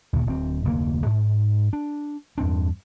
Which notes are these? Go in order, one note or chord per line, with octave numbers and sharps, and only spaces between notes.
D2 A#2 C#3
D1 C4
F1 D2 A#2 A#3
G#2
D4
E2 G2 C4 D4